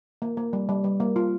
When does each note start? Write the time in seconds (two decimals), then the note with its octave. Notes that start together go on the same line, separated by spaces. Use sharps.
0.22 A#3
0.37 A#3
0.53 G3
0.69 G3
0.84 G3
1.00 A#3
1.16 F4